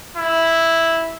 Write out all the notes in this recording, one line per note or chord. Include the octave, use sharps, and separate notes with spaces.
E4